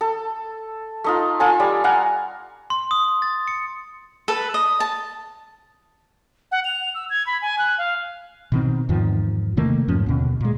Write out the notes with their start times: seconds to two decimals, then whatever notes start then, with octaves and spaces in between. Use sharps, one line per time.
0.01 A4
1.04 A3 D#4 F4
1.40 F4 A4 G#5
1.60 G3 D5
1.84 F5 F#5 G#5 A#5
2.70 C6
2.91 D#6
3.22 A6
3.48 C#7
4.28 A4 B4
4.54 D#5
4.80 A5
6.52 F#5
6.65 F7
6.95 E6
7.10 G#6
7.27 B5
7.42 G#5
7.58 F#6
7.78 F5
8.52 B2 D#3 C4
8.89 E2 G#2 D#3 F3
9.57 C3 D#3 A3 A#3
9.88 F2 G#2 F3 C#4
10.06 D#2 B2 D3
10.41 A#2 G#3